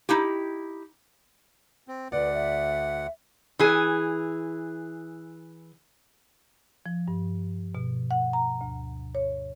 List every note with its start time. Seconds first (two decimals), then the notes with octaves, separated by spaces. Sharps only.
0.09 D#4 E4 G4
1.88 C4
2.12 D2 B4 D5 F#5
2.33 E5
3.59 E3 G#4
6.86 F3
7.08 G2
7.75 B2
8.11 F#5
8.33 A#5
8.61 D2
9.15 C#5